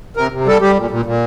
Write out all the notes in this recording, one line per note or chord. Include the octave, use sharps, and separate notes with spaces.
C3 A#4
C3
G3 A4
G3 G4
A#2
A#2
A#2